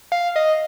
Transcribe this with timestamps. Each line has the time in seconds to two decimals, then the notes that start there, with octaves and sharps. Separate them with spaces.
0.12 F5
0.36 D#5